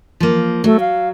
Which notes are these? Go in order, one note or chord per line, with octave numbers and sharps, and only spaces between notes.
F3 A#3
F#3 A3
F5